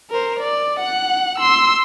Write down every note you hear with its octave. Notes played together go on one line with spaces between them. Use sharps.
A#4 C5
D5
F#5 F#6
C6 E6